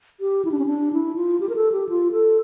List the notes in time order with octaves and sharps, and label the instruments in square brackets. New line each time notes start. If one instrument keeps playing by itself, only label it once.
[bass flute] G4
E4
D4
C#4
D4
E4
F4
G4
A#4
A4
G4
F4
A4